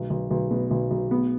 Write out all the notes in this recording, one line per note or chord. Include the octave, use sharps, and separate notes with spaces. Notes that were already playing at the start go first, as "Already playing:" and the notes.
Already playing: B1
B1
B1
B2
B1
B1
B3